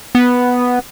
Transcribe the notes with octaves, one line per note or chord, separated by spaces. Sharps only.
B3